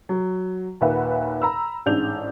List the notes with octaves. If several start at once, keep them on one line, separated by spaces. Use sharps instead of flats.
F#3
D#2 A#2 B4 E5 F#5
A#5 B5 E6
A1 G#2 D4 G6 F7